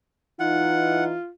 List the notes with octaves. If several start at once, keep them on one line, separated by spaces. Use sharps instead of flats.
E3 D#4 F4 F#5